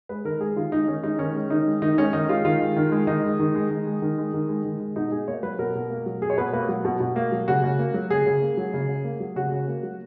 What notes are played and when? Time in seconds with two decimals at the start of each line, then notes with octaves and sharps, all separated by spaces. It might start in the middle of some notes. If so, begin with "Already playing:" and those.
0.09 G#3 B4
0.25 D#3 A#4
0.40 G#3 G#4
0.56 D#3 F4
0.72 G#3 D#4
0.87 D#3 C#4
1.03 G#3 D#4
1.19 D#3 C#4
1.35 G#3
1.50 D#3 D#4
1.67 G#3
1.82 D#3 D#4
1.98 G#3 C#4
2.13 D#3 D#4
2.29 G#3 F4
2.45 D#3 F4
2.61 G#3
2.76 D#3
2.92 G#3
3.07 D#3 D#4
3.24 G#3
3.39 D#3
3.55 G#3
3.70 D#3
3.87 G#3
4.02 D#3
4.18 G#3
4.34 D#3
4.49 G#3
4.65 D#3
4.80 G#3
4.96 B2 D#4
5.12 B2 G#4
5.28 A#3 C#5
5.43 F#3 B4
5.59 B2 A#4
5.75 B2
5.90 A#3
6.06 F#3
6.22 B2 G#4
6.30 C#5
6.38 B2 B4
6.53 A#3 B4
6.69 F#3
6.85 B2
7.00 B2
7.16 A#3
7.32 F#3
7.48 C#3 F#4
7.63 C#3
7.79 A#3
7.94 F#3
8.10 C#3 G#4
8.26 C#3
8.42 A#3
8.57 F#3
8.74 C#3
8.89 C#3
9.04 A#3
9.20 F#3
9.36 C#3 F#4
9.52 C#3
9.68 A#3
9.83 F#3